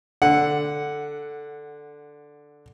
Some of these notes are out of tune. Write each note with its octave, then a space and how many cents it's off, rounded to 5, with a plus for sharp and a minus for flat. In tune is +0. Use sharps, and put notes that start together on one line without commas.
D3 +0 F#5 +0